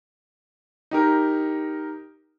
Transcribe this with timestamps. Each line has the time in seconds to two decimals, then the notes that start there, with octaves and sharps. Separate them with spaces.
0.91 D#4 G4 A#4